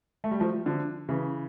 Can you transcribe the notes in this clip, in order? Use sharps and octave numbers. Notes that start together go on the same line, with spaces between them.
A3
G3
F3 A3
D3 F3
C#3 E3